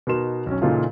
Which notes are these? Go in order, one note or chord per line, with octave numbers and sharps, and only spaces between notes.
B2 B3 D#4 A#4 C6 E7
B1 C#4
A#2 C#3 E3 D#4 F4 A4